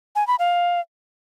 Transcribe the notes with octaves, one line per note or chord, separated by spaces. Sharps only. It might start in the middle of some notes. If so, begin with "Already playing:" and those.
G#5
B5
F5